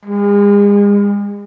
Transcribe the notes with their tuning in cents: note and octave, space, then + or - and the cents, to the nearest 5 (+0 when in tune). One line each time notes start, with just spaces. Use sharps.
G#3 -40